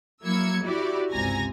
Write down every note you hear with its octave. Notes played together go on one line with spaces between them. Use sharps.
F#3 A#3 E4 E6 G#6 C#7
E4 F#4 G4 D5
G1 C#2 C3 G#5 A#5 A#6